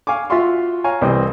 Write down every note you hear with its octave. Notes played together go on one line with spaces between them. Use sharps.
F5 G#5 C#6 D6
F4 F#4 E5 F5 C6 C#6
C#5 F5 G#5 A#5 C#6
C2 E3 C4 D#5